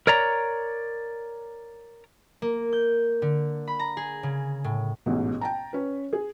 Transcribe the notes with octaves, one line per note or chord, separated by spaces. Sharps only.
A#4 C#5 D5 A#5
A#3
G6
D3
B5
A#5
G#4
C#3
A2
A1 G#2 B2
G5 A5 A#5
C#4 B4
G#4